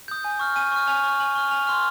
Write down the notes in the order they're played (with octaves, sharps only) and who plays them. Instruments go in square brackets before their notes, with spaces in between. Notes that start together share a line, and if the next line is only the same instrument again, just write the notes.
[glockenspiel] D#6 G6
G#5
C#6 F6
G#5 D#7
C#6 F6
G#5 F7
C#6 F6
G#5 F#7
C#6 F6 G7
G#5 F7
C6 F6